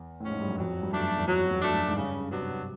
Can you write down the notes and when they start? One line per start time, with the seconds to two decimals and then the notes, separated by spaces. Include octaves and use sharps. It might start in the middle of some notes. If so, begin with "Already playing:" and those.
Already playing: E2
0.20 A2 F3 G#3 C#4
0.31 G#2
0.40 G2
0.48 F#2
0.58 F2 F#3
0.82 G2
0.93 F#2 A3 D4
1.17 E2
1.27 F2 F#3
1.51 E2
1.62 A3 D4
1.74 F#2
1.88 G#2
1.96 G2 C#3
2.31 C3 F#3 B3 D4